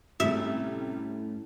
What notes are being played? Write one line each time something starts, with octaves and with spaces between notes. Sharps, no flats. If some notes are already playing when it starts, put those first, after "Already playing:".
A2 C3 G3 A3 C#4 E4 E5